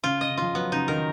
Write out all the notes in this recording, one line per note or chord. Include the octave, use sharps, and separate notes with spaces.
C#3 F4
D#5
C#3
F3 F4
F#3 B3
C#3 D#4
D#3 A#4